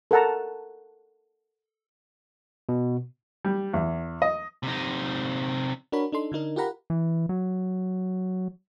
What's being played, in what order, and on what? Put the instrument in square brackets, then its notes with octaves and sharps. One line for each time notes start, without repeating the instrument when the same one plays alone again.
[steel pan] A4 A#4 F#5 A5 A#5
[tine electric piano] B2
[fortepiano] G3
E2
D#5
[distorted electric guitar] C3 D#4
[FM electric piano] D4 F#4 A#4 C#5 B5
D4 D#4 A4 C6
D3 D4 D#4 A#4
F4 G4 A#4 F#5 A#5 B5
[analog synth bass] E3
F#3